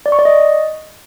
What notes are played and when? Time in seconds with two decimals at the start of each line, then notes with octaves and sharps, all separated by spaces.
0.06 D5
0.12 C#6
0.19 D5
0.25 D#5